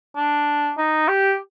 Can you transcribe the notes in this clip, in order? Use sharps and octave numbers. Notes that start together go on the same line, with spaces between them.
D4
D#4
G4